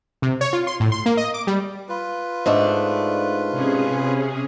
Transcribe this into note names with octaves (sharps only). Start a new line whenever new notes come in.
C3
C#5
F4
C6
A2
C6
A#3
D#5
D6
G3
F4 B4
G#2 A3 D4
C3 C#4 G#4